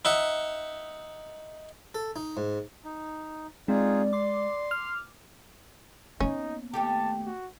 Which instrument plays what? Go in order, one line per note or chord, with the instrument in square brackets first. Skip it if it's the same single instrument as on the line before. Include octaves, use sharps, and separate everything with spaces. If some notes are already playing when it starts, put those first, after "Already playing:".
[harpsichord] D#4 E5 F#5
A4
D#4
G#2
[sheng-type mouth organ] D#4
[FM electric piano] G#3 [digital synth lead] C4 [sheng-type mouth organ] D#4 F4 G#4 [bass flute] D5
[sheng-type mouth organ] C6 [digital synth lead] D6
[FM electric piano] F6
[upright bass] A#3 B3 [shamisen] C#4 [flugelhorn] D#4
[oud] D#2 A3 G4 [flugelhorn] A5
[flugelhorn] F#4